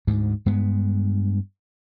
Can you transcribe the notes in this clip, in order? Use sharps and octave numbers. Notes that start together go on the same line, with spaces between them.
D2 G#2
G2 G#3 B3